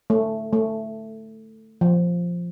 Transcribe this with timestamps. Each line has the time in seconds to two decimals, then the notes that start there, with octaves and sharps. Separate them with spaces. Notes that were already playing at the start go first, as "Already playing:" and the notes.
0.10 A3
0.53 A3
1.81 F3